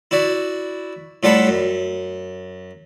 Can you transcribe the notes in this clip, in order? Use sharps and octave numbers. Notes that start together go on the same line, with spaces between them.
E4 F#4 D5
A2 G3 F4 A4 F#5 B5
F#2